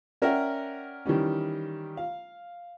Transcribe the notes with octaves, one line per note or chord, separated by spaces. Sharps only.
C#4 A#4 D5 E5 F#5 G5
D#3 E3 G3 C#4
F5